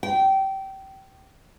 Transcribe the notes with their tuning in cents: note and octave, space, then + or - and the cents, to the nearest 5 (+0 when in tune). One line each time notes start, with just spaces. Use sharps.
G5 -20